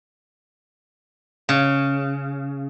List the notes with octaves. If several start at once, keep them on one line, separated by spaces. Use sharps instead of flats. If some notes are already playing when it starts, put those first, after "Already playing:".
C#3